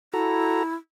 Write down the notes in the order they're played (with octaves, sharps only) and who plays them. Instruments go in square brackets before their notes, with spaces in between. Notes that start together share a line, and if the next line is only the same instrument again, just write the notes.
[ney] E4 [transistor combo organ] F#4 A4 A#5